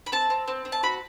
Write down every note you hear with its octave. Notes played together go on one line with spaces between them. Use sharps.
B5
C4 A5
C4
C4
C4
A5
F#4 B5